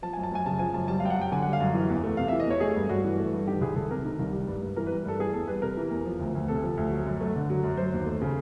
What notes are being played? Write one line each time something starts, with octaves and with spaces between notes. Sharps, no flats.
F3 A5
G#5
F#2
A5
F#2 G#5
C#3 A5
F3 G#5
F#2 A5
G3 A5
F5
F#2 G5
F#5
F#2 G5
D3 G#5
F#5
G3
F5
F#2
E3
E2
A3
C3 F5
E5
E3
D#5
E2 C#5
A3 G#4
G2
G2 F#4
E3
A3
G2
D#3 G4
C2 G#4
C2 A4
C3 A#4
D#3
C2
G3
G2
G2
E3 A#4
B4
G3
G2 A4
E3 G#4
E2 A4
G3 B4
C3 A#4
E3
E2
F3
D2
D2
C3 A4
F3
D2
F#3
F#2
A3
D3
F#3
F#2
F#3 C5
D#2
A3
C#3